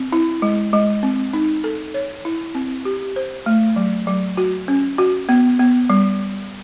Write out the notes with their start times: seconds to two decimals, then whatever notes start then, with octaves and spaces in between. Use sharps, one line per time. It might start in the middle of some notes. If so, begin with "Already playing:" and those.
Already playing: C4
0.12 E4
0.42 G#3
0.73 G#3
1.03 C4
1.34 D#4
1.64 A4
1.94 C#5
2.25 E4
2.55 C4
2.85 G4
3.16 C5
3.46 A3
3.76 F#3
4.07 F#3
4.37 F#4
4.68 C#4
4.98 F#4
5.29 B3
5.59 B3
5.90 G3